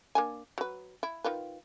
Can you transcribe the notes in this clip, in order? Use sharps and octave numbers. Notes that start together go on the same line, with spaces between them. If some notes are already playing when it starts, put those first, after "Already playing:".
A#3 D4 G#5
F#3 B4
E4
D#3 F4 B4